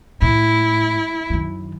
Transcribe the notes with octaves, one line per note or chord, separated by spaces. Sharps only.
A2 E4
F#2 D#3